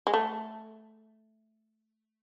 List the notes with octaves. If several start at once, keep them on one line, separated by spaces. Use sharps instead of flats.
G#3
A3